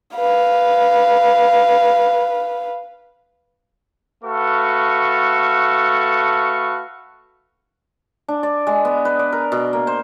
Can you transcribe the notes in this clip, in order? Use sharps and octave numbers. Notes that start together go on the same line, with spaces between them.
B4 F5
A3 F#4 A4 B4 F5 C#6
D4
D5
G#3
B3
B4
D5
A#4
B2
A#3
C5